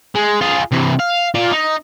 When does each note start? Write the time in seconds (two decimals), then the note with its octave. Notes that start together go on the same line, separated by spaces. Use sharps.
0.15 G#3
0.41 F4 G#4
0.72 C3 E3
1.00 F5
1.35 F4 D5
1.51 D#4